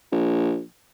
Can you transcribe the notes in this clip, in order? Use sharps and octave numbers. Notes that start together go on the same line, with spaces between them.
A#1